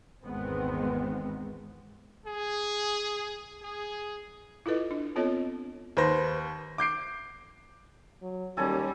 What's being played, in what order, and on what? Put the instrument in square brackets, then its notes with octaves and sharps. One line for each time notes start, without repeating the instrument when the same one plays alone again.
[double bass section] G#1 E2 D#3 G#3 B3 C4
[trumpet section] G#4
G#4
[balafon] E4 F4 A4 B4 D#5
D4
B3 C4 F4 A4 C#5 D#5
[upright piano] D#2 B4 C5 A#6
D6 G6 C7 D7
[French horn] F#3
[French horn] D#2 [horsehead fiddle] G3 C#4 [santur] A4 G#5